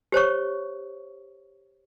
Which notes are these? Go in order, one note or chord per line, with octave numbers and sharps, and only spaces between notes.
G4 C5 C#5 C#6